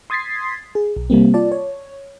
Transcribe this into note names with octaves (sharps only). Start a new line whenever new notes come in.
C6 D#6 G#6 A6 B6 C7
G#4
B1
C3 G3 A#3 C4
F4 D5 A5
C#5